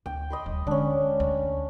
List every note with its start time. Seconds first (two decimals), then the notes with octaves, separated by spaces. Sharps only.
0.06 D2 G5
0.30 D#5 B5 C6
0.46 D#1
0.67 D3 G#3 C#4 D4
1.20 D2